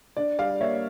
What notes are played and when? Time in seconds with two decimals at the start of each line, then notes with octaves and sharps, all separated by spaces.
0.17 D4 D5
0.39 G3 D5 F5
0.61 A#3 C#5 E5